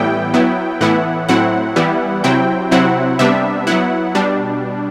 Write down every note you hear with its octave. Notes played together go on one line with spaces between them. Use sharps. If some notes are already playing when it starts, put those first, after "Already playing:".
Already playing: A2 E3 G3 B3 E4 G5
F#3 B3 E4
A2 E3 B3 E4 F#5
A2 F#3 C4 E4 F#5
E3 G3 B3 E4
C3 F#3 C4 E4 G5
C3 F#3 C4 E4 F#5
C3 G3 B3 D4 E5
F#3 B3 E4 F#5
B2 G3 D4